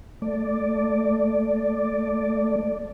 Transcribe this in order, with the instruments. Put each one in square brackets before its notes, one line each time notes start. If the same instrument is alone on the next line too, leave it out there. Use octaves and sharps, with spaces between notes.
[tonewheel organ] A3 D5